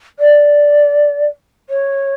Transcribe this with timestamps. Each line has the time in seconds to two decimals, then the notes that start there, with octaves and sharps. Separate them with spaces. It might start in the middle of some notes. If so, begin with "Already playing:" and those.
0.19 D5
1.69 C#5